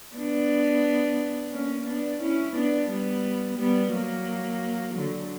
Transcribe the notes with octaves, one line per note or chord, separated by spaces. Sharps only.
B3 D4
A#3 C#4
B3 D4
C#4 E4
B3 D4
G3 B3
G3 B3
F#3 A#3
D3 F#3